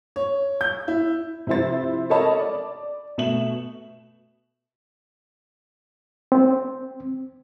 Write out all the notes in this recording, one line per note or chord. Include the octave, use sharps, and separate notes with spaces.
C#5
G6
E4
C3 F3 E4 C5 A6
A4 A#4 C#5 D#5 A5 B5
D5
B2 A3 E7 F#7
C4